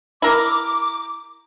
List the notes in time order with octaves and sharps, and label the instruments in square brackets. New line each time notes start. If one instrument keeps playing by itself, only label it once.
[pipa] E4 A#4 [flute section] D6